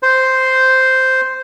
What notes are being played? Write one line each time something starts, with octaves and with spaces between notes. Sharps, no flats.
C5